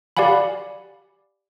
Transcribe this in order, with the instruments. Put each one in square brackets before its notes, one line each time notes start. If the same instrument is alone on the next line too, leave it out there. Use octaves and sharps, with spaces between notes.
[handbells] G4 D5 F5 F#5 G#5 B5